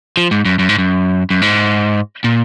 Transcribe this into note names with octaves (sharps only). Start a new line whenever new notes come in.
F3
G#2
F#2
F#2
G#2
F#2
F#2
G#2
A#2